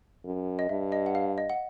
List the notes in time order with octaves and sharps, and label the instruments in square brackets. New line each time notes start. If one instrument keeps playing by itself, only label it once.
[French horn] F#2
[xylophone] D#5
[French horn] G2 [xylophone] E5
[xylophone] D#5
F#5
F5
D#5
F#5